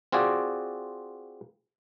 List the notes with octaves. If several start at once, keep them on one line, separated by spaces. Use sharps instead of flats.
C4 F4 F#4 G#4 D5